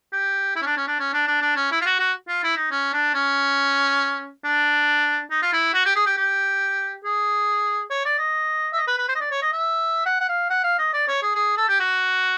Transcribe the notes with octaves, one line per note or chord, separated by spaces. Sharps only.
G4
E4
C#4
D4
C#4
D4
C#4
D4
D4
D4
C#4
E4
F4
F#4
F#4
F4
E4
D#4
C#4
D4
C#4
D4
D#4
F4
E4
F#4
G4
G#4
G4
G4
G#4
C#5
D5
D#5
E5
D#5
B4
B4
C5
D#5
D5
C#5
D#5
E5
F#5
F#5
F5
F#5
F5
D#5
D5
C#5
G#4
G#4
A4
G4
F#4